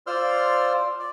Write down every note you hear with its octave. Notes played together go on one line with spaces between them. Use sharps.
F4 C5 D5 C6 E6 F6
D5